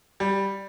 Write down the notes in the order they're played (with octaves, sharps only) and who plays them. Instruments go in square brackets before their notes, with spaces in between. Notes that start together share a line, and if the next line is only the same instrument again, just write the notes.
[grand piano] G3